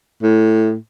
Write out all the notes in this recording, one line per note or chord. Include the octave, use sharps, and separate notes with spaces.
A2